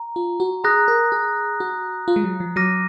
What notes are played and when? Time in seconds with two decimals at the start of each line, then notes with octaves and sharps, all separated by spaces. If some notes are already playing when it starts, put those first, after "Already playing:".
Already playing: A#5
0.16 F4
0.40 F#4
0.64 G#4 A#5 D#6 F#6 A#6
0.88 A#4
1.12 G#4
1.60 F#4
2.08 F4
2.16 G#3
2.24 F#3
2.40 F3
2.56 F#3 D6 F6 A#6 D#7